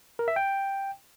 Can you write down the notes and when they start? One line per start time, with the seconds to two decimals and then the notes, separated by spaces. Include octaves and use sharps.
0.19 A#4
0.28 E5
0.36 G5